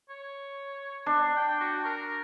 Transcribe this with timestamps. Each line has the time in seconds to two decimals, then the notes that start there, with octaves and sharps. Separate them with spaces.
0.10 C#5
1.06 D4
1.37 G5
1.61 F#4
1.85 A#4